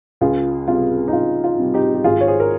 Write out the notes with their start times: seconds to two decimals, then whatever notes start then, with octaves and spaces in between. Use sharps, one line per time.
0.21 C#2 F4 G#4
0.68 C3 G3 F4
1.08 D#4
1.13 C#2 F4
1.44 F4
1.58 C3 G3
1.74 D#4 G4
1.95 G4
2.04 G#1 F4 G#4
2.21 C#5
2.27 G#4 C5
2.40 A#4